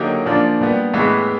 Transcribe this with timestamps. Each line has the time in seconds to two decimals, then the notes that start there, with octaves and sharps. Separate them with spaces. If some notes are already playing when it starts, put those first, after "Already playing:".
Already playing: D3 F#3 A#3 D#4 G4
0.26 A#2 F3 A#3 D4 F4
0.60 A#2 G3 B3
0.94 A2 E3 G#3 B3